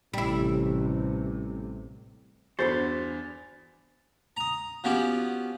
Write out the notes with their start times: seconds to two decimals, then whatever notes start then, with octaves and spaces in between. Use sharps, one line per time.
0.14 A1 C3 G3 E4
2.59 E2 G2 F#4 A4 C5 B5 A6
4.37 A#5 D#6
4.84 F3 B3 C#4 F#4 G4